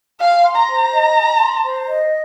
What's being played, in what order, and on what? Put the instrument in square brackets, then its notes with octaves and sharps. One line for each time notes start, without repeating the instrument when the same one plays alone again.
[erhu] F5 [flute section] G#5
[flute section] C6
[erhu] A#5
[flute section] C5
D#5
G#5
C6
C5
D#5